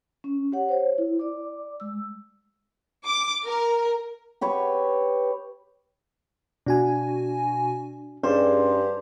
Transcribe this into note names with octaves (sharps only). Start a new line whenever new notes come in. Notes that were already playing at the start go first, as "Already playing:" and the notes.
C#4
G4 C#5 F#5
C5 C#5
E4
D5 D6
G#3 E6
D6
A#4
G4 B4 C#5
B2 D4 F#4 G#5
G2 C#4 D#4 G4 G#4 C5 D5